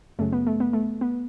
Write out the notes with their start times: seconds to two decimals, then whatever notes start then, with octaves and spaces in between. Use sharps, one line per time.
0.19 F#2 C#3 F#3 A3
0.32 B3
0.47 A3
0.60 B3
0.73 A3
1.01 B3